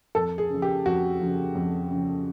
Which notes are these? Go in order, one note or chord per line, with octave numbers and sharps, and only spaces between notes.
F2 A4
G#4
C#3 F3
G4
F2 F#4
C#3 F3
F2
C#3 F3